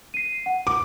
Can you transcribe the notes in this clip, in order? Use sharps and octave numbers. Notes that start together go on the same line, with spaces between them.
C7 D#7
F#5
D6